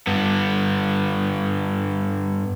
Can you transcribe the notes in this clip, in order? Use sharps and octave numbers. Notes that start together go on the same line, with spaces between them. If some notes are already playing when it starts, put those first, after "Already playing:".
G2 B3